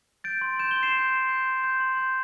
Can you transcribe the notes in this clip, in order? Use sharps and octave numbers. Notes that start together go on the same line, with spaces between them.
G6 A6 D7
C6
G6 E7
G7
C6
C7 E7
G6
C6
G6
C6
G6
C6
G6